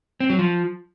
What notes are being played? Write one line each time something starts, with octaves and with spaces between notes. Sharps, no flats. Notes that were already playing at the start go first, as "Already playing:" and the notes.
C4
F#3
F3